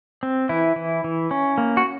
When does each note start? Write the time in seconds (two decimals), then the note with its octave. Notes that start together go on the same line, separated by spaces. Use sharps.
0.23 C4
0.49 E3 E4
0.76 E3
1.04 E3
1.31 C#4
1.58 A#3
1.77 F#4